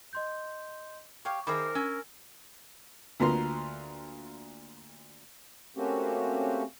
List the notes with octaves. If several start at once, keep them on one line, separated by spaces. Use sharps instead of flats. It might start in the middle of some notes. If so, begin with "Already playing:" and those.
D#5 C6 G6
G4 C#5 F5 C#6
D#3 G#4 A#4 C5 E5 B5 D6
C#4 G#5 E6
D2 A#3 F4 B4 A#5 C6
A3 A#3 C4 C#4 F#4 G4